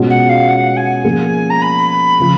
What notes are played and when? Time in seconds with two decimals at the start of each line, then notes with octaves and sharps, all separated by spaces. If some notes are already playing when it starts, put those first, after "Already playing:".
Already playing: B2 G#3 C#4 F4
0.09 F#5
0.29 F5
0.48 F#5
0.76 G#5
1.04 F3 A#3 C#4 G#4
1.50 A#5
1.61 B5
2.20 C#3 F3